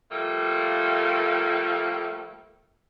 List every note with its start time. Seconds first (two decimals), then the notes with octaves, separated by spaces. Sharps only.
0.11 F3 G3 A3 A#3